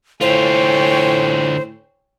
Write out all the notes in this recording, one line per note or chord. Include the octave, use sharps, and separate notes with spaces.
A2 D3 F4 C5 C#5 G5 G#5